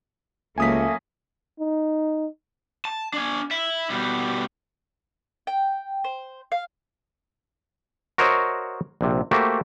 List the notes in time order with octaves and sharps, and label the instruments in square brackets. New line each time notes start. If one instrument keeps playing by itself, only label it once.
[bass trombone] C#2 [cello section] F#3 A#3 C#4 [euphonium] A3 [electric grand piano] G#5 D#6 B6
[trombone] D#4
[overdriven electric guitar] A5
D4 G#5
E4 E5
B2 G3
[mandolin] G5
C5
F5
[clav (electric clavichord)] F#4 A#4 C5 C#5 D#5 E5
A#1 C3
A3 A#3 F#4 G4 C5